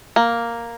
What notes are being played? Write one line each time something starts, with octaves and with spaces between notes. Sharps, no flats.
A#3